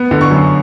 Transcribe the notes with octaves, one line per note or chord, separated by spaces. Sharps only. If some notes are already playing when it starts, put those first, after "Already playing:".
Already playing: B3
D3
C#6
F#2